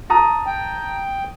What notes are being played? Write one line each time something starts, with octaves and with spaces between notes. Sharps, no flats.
A5 A#5 D#6
G5